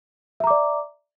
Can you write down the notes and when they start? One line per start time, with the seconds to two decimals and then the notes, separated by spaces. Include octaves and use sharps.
0.40 E5
0.44 A#5
0.47 D6
0.50 D5